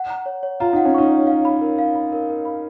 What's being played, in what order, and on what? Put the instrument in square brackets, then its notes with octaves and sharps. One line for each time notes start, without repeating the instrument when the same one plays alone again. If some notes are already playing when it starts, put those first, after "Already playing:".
Already playing: [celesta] F#5
A#5
C#5
C#5
[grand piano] F4 [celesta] A#5
[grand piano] D#4 [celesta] F#5
[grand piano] C#4
[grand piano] D#4 [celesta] C#6
[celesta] C#5
F5
B5
A#4
F5
B5
A#4
A#4
B5